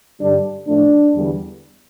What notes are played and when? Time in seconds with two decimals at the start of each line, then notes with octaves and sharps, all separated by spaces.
0.20 G2 D3 G3 D4
0.67 A2 F3 A3 D4
1.14 E2 D3 G3